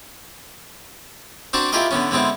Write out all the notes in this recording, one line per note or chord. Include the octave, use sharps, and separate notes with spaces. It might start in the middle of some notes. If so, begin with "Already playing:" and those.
C4 D4 F#4 A5 A#5
E4 F4 G4 G#4 A#4 D#5
D3 B3 C#4
D3 G#3 B3 C4 E4